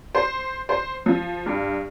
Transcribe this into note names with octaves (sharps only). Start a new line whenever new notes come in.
C5
C5
F3
G2